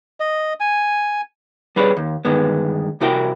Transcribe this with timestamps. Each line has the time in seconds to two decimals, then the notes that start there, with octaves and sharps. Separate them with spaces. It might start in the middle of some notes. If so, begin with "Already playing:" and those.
0.20 D#5
0.60 G#5
1.76 G3 G#4 B4 C#5 D5
1.97 D#2
2.25 G2 D3 D#3 G#3 B3
3.00 C2 C3 E4 F#4 A#4 G5